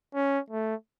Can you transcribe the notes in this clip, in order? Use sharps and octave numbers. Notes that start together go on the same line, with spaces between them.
C#4
A3